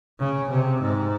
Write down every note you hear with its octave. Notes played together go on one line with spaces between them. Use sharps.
C#3
C3
G#2